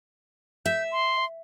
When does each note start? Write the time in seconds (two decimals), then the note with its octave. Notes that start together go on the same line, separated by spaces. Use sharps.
0.66 E5 G6
0.92 C6